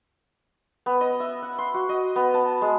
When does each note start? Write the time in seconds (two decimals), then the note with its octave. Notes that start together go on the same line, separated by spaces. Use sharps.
0.86 B3
1.01 D#5
1.20 E5
1.42 F#5
1.58 C6
1.74 F#4
1.89 D#5
2.16 B3
2.34 A5
2.62 G#3